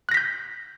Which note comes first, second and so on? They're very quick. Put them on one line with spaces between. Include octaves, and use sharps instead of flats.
F#6 A#6 B6 G6